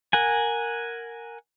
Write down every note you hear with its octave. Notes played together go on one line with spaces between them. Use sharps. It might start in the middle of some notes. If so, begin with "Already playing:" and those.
A#4 F#5 G#5